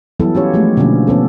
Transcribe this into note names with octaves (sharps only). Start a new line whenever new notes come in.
E3 F#3 G3 B3 E4 A4
C#4 F4 G4 C#5
F3 G#3 A3 G4
B2 D3 F3 A#3 C#4
F3 B3 C#4 A4